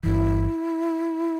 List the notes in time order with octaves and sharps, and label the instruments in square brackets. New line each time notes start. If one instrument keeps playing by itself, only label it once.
[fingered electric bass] G1 G2 E3 [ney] E4